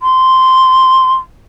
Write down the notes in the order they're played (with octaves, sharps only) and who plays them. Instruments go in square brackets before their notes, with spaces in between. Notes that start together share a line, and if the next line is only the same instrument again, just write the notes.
[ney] C6